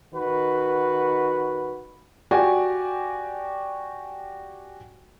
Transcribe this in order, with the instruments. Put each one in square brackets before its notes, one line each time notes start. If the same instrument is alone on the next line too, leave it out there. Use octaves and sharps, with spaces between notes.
[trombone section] D#3 F#4 B4
[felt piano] F#4 G4 D5 G#5